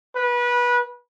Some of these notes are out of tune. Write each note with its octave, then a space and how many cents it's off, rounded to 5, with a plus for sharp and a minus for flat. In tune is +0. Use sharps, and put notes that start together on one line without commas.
B4 -25